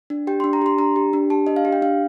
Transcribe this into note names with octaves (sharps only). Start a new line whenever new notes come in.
D4
G4 G5
C6
D4
A#5
G4 C6
D4 A#5
G4
D4
G4 A5
D4 D#5
F5
G4
G5
D4 F5